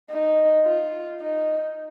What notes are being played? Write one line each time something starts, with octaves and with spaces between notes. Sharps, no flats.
D#4
F4
D#4